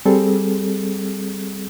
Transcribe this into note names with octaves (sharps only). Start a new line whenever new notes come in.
G3 C4 G#4 A4